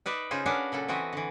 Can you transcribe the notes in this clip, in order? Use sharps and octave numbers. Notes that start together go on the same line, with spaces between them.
D#4 B4 D5 E5
C#3 D#4 F4 G#4 C5
C#4 D4 F#4 A#4 B4 F5
A#2 C#3 F#3 A4
E3 C4 F#4 D#5 E5
D3 E3